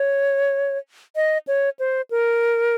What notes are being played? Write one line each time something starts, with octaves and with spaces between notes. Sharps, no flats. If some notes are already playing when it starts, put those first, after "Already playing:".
Already playing: C#5
D#5
C#5
C5
A#4